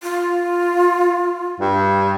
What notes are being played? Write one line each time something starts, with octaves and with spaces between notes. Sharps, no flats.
F4
G2